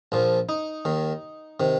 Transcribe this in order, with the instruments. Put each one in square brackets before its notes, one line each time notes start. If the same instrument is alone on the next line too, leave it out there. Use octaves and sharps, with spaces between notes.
[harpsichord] A#1 A#2 F3
D#4
D#2 D#3
C3 D#3